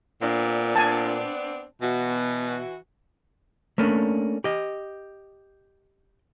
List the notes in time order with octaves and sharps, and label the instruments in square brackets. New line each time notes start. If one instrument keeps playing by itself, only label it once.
[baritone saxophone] A#2 [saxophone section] B3 C4 D4
[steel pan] G#5 A5
[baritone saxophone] B2 [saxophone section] E3 F#4
[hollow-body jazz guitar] A3 A#3 C#4 D4
G4 D#5